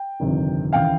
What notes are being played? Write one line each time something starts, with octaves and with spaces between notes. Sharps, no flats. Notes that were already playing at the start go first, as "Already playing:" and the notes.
Already playing: G5
G1 F2 C3 D#3
D#2 C#3 E3 F5 G5